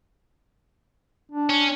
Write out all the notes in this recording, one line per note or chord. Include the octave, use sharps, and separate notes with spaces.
D4
C#4